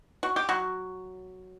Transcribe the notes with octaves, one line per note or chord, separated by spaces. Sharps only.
F#4
G4
F#3 F#4